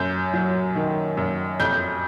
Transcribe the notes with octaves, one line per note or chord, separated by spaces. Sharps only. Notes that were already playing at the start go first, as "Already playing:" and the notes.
Already playing: F#2 G6
F#3
D#3
F#2
F2 G6